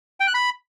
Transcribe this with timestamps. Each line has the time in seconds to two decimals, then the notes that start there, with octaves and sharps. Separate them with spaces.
0.20 G5
0.27 F#6
0.34 B5